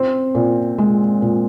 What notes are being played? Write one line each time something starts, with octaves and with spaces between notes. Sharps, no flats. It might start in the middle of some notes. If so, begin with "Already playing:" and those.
Already playing: C4
A#2
G#3
A#2